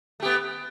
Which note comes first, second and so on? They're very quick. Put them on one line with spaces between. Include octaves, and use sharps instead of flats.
A3 G4 B3